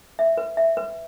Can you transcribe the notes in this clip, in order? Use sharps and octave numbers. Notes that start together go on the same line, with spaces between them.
E5
B4
E5
B4